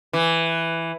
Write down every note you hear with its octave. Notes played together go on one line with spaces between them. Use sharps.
E3